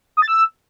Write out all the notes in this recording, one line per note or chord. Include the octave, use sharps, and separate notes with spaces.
D#6
A6
E6